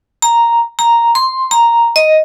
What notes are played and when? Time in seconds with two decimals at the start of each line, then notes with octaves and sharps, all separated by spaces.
0.22 A#5
0.79 A#5
1.15 C6
1.51 A#5
1.96 D#5